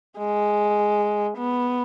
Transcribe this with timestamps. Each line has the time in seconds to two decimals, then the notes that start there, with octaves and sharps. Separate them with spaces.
0.18 G#3
1.38 B3